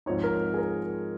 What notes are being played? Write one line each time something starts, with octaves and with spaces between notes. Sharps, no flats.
G#2 F3 C4 D#4 C#5
A#4
G#4
A#4